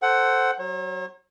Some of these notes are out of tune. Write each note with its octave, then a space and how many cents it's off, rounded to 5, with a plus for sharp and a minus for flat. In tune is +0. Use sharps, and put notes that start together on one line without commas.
A4 +0 C5 +0 F#5 +15
F#3 +20 C#5 -45